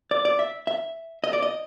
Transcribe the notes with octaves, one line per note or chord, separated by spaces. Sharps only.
D5
D5
E5
E5
D#5
D5
D#5